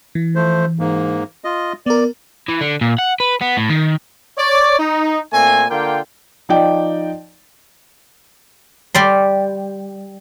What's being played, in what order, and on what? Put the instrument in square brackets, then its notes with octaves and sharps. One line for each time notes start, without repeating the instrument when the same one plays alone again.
[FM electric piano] E3
[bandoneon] F3 A3 C5
G#2 A#3
F4 D#5
[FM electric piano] B3 A#4 [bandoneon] D5
[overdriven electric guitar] E3
D3
A#2
F#5
B4
B3
A2
D#3
[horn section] C#5 D5
D#4
A#2 A3 C4 G#5
D3 A#3 F4 G5
[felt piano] F3 D#4 D5 G5
[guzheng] G3 D5 C6